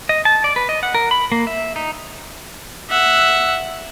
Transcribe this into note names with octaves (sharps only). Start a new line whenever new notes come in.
D#5
A5
D5
B4
D#5
F#5
A#4
B5
A#3
E5
D#4
E5 F#5